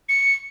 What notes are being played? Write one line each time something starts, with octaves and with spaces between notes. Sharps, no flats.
C#7